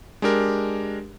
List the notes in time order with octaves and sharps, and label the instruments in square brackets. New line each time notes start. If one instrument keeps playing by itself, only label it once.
[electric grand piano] G#3 D4 G4 A#4